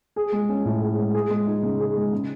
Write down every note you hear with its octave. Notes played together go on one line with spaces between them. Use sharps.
G#4
G#3
C#4
A2
G#4
G#3
G#4
G#3
D#4
C#3
G#4
G#3
C#3